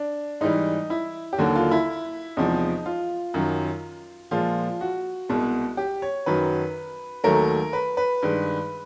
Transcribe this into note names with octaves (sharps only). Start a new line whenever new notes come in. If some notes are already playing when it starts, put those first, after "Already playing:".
Already playing: D4
G#2 E3 G3 D#4
E4
G4
D#2 D3 F#3 A#3 F#4
F4
E4
E2 C3 F3 G#3 D#4
F4
F#2 D#3 F#3
A#2 F3 G#3 F4
F#4
C2 B2 G#3
G4
C#5
F#2 D#3 F#3 B4
D#2 D#3 F#3 A3 A#4
B4
B4
G2 D#3 G#3